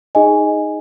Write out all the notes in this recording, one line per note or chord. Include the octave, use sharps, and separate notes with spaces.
D#4 G#4 D#5 G#5